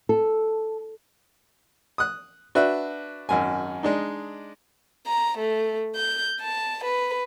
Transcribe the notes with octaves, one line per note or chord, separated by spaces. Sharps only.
A4
D#6 F#6
D4 F#4 B4 E5
G#1 F#2 G#5
G#3 D4 D#4
A#5
A3
G6
A5
B4